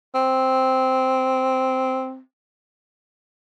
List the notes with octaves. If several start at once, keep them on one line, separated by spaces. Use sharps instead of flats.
C4